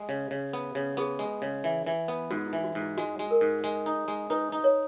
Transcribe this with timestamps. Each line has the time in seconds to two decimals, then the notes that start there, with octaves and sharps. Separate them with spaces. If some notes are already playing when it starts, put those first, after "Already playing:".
Already playing: G#3
0.09 C#3
0.31 C#3
0.53 B3
0.75 C#3
0.97 B3 G#4
1.19 G#3
1.42 C#3
1.64 E3
1.86 E3
2.08 B3
2.31 G#2 F#4
2.47 E4
2.53 E3
2.64 F#4
2.75 G#2
2.81 E4
2.97 G#3 F#4
3.19 G#3
3.31 A#4
3.41 G#2
3.64 G#3
3.86 D#4
4.08 G#3
4.30 D#4 B4
4.52 D#4
4.64 C#5